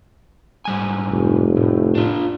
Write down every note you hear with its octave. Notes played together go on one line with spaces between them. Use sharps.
G#2 G3 G#5
F1
A2
D4 F4